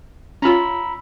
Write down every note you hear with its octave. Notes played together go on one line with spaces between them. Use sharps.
C#4 F4 A#5 B5 E6